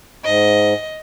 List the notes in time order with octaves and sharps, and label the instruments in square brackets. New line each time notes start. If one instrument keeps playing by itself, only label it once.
[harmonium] G#2 [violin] D#5